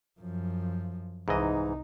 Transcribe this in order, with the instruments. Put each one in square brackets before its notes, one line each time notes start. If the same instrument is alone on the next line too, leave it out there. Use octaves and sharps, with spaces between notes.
[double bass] F#2 F3
[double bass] C2 D#4 [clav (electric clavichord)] G#2 E3 D#5